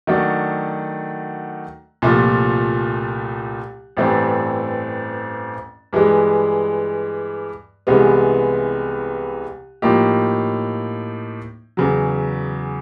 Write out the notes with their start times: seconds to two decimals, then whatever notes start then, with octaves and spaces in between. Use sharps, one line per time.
0.07 D#3 F#3 A3 D4 F#4
2.02 C2 A#2 F3 A3
3.97 A1 G2 E3 A3 C4
5.93 G2 E3 G#3
7.87 C2 C3 E3 G#3 B3
9.82 A2 F3 A#3 D#4 G4
11.77 E2 C#3 F#3